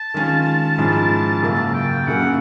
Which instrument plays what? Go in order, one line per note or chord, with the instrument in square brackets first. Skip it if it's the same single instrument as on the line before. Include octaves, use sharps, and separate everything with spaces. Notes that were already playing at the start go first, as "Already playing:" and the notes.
Already playing: [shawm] A5
[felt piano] D#3 G#3 C#4 F4
G#2 F3 G#3 C#4 E4
[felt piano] F#2 C#3 F#3 A#3 [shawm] A5
[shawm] G5
[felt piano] F#2 C#3 F#3 A#3 C#4 [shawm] F#5